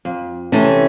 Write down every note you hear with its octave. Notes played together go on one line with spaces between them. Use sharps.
F2
C3 E3 A3 C#4